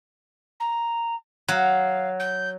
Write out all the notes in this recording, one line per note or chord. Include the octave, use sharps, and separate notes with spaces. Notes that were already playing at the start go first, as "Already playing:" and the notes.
A#5
F#3 F5
G6